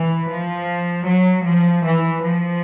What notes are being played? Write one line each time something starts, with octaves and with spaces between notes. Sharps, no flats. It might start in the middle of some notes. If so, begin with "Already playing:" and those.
Already playing: E3
F3
F#3
F3
E3
F3